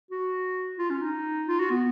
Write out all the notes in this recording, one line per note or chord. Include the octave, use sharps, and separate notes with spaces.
F#4
F4
C#4
D#4
F4
F#4
B3